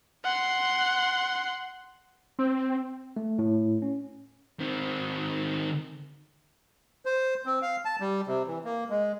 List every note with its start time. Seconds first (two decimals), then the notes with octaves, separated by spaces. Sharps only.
0.24 F#5 C6
2.39 C4
3.16 A3
3.39 A2
3.82 C#4
4.60 D#3 C4
7.05 C5
7.46 C4
7.62 F5
7.85 A5
8.00 G3
8.27 C3
8.47 E3
8.64 A#3
8.90 G#3